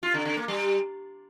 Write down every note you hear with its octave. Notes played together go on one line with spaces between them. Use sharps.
F4
D3
D3
A#3
G3